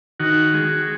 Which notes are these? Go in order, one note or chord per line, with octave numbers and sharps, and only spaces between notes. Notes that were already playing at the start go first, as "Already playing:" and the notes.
D#3 F#4
G#3